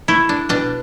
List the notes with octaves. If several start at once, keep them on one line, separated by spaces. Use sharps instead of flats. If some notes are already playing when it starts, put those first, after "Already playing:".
A3 E4
D4
B2 D4